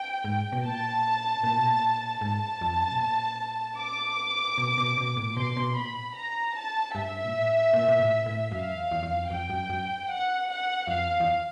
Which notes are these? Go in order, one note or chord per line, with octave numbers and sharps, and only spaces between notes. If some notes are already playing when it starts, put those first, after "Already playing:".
Already playing: G5
G#2
B2
A#2 A5
A#2
B2
A#2
G#2 A5
F2
F#2
B2
A#2
D6
B2
B2
B2
A2
A#2
B2 C6
B2
A#2 B5
A#5
A5
G2 E5
A#2
A2
A#2
A#2
A2
A2
F#2 F5
E2
E2
E2
F2
F2 G5
F#2
F#2
F#5
F#5
F2 F5
E2
E2